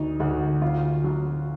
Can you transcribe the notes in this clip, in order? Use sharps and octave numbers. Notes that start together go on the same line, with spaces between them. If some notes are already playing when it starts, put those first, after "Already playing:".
Already playing: D2 D#4
D2 F#4
D2 F4
F#3